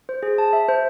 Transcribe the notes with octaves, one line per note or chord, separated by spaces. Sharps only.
C5
G#4
A5
E5
C5